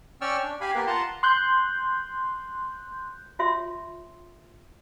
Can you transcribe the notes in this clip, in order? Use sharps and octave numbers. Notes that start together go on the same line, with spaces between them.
C#4 D5 G5 C#6 E6 F6
D4
G4 F5 G#5 B5
A#3 B3 G4 A#4 B4
F4 F#5 A5 A#5 C6
C6 F#6 G6
F4 C#5 E5 C6